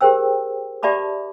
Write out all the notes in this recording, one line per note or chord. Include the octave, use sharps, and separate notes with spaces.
G4 G#4 A#4 C5 G5 E6
G4 D5 E5 A5 B5 D6